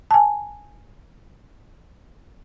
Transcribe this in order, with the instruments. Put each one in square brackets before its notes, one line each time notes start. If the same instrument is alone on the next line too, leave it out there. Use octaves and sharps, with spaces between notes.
[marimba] G#5 A5